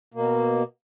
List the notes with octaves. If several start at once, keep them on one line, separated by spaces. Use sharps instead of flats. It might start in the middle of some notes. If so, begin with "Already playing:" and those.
B2 A#3